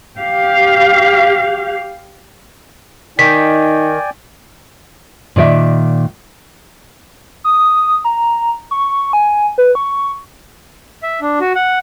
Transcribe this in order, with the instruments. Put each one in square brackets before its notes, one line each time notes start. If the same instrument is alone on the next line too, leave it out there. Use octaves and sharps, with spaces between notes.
[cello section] G4 F5
[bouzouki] D#3 [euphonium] D#4 [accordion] D5 G5 G#5 [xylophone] B6
[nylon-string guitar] A#2 D#3 D5 E5
[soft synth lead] D#6
A#5
C#6
G#5
B4
C#6
[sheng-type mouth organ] E5
D4
F#4
F#5